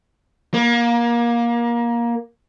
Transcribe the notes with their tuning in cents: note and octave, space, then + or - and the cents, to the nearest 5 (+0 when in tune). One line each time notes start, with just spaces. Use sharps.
A#3 +20